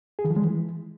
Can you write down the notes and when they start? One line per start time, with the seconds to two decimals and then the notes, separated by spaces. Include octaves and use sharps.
0.19 G#4
0.25 D#3
0.30 F3
0.36 G#3
0.42 E3